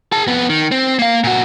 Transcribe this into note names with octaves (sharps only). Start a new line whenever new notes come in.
G#4 A5
F2 B3
D#3
C4
A#3 F5
A#2 F#4